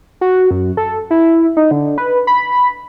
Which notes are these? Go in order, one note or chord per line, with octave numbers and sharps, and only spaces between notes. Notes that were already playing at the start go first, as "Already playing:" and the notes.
F#4
F#2
A4
E4
D#4
D3
B4
B5